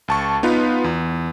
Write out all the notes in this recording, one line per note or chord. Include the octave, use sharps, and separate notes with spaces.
C#2 A5 C#6
B3 D#4 F4 B4
E2